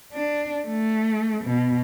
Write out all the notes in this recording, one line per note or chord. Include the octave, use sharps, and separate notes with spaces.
D4
A3
B2